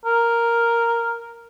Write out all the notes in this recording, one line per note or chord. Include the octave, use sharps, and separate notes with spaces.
A#4